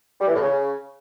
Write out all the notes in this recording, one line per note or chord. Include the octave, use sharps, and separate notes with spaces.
G3
E3
A2
C#3